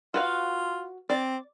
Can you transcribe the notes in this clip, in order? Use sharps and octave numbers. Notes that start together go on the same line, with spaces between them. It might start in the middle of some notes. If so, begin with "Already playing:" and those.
F4 F#4 B4 F5
C4 D5